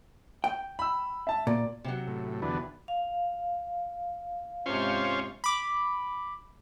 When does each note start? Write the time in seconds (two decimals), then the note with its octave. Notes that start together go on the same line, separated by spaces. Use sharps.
0.44 G5
0.79 B5 E6
1.27 E5 A5
1.47 A#2 D5
1.84 C3 F#3
2.07 A2
2.42 E2 D3 B3
2.88 F5
4.66 G#2 C3 C#4 F4 C5
5.44 B5 D6